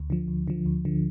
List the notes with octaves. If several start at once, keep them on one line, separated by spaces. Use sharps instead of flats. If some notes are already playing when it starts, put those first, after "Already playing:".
Already playing: D2
D3 F3
D2
D3 F3
D2
D3 F3